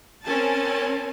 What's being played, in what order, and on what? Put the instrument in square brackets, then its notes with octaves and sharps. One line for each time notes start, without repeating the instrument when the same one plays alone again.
[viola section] C4 C#4 A#4 G#5 A5